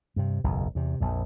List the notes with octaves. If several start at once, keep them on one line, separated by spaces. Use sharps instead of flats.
G2 C3
F#1 B1 E2
E2 C3
A#1 F2